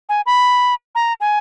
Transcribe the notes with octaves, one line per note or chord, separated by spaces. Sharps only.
G#5
B5
A#5
G#5